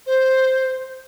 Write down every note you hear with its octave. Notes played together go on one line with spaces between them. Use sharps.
C5